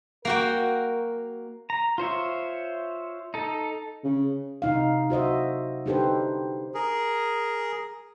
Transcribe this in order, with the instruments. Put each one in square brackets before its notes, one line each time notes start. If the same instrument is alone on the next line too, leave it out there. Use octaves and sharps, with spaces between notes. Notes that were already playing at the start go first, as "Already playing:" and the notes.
[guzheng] A#3 F#4 G5 [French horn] A#4
[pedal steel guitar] A#5
F4 C5 C#5 E5
D#4 A4
[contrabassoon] C#3
[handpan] C3 D#4 F5
F#4 C5 D#5 E5
D4 D#4 G4 A4 B4 C5
[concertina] G#4 A#4